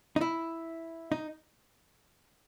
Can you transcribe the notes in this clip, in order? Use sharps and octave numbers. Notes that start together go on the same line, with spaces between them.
D#4
E4
D#4